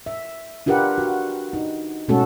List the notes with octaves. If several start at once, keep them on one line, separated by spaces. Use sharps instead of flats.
E5
D4 F4 G4 A#4 B4 F#5
F#4
D#4
B2 G#3 A3 C#4 F#4 A4